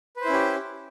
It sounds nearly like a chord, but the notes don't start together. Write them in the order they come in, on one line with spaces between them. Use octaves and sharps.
B4 C5 E4 C#4 G4